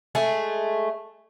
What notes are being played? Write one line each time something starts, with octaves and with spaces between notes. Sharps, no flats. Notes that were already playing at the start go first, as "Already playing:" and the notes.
G#3 A3 G#4